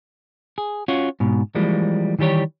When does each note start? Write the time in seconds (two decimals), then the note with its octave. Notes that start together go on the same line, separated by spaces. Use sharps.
0.58 G#4
0.88 C#4 F4 F#4
1.20 G#2 B2
1.55 E3 F3 G3 G#3 A#3
2.19 D#3 E3 G3 G4 C#5